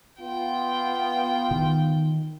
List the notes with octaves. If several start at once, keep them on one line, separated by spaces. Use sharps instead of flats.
B3 F4 G5
D#3